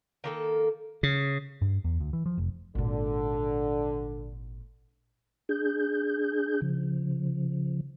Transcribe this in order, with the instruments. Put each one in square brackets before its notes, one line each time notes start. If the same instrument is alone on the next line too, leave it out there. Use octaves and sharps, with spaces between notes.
[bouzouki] D#3 A#3 A4
[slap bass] C#3
[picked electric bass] G2
E2
D2
E3
F3
F1
[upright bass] G#1 A#2 [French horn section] D3
[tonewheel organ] D4 G#4 G6
C#3 F3